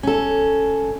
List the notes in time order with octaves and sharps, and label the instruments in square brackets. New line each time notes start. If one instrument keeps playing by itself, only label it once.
[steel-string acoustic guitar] C#4 A4